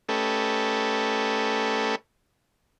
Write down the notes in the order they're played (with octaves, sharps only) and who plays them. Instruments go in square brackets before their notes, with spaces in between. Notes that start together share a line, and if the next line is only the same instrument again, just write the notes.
[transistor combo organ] A3 C#4 G4 A4 B4 D#5